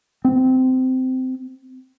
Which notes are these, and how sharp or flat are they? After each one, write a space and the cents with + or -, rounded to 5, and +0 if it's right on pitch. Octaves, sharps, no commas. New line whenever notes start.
C4 -20